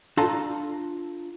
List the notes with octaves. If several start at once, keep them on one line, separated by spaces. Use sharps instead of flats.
D4 F4 A4 A5 A#5